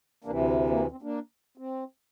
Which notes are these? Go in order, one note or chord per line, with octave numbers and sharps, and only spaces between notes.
D2 C3 E3 A#3 D4
A#3
C4
C4
A#3 D4
C4